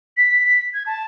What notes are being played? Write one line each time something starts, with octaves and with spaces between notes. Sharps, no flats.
B6
G#6
A5